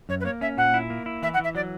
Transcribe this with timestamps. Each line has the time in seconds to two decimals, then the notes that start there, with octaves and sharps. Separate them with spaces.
0.09 F#2 C#5
0.20 B4
0.25 A#3 C#5
0.41 C#4 E5
0.57 A#2 F#5
0.74 E4
0.90 A#3
1.06 E4
1.22 E3 E5
1.34 F#5
1.39 E3 E5
1.55 F#3 D5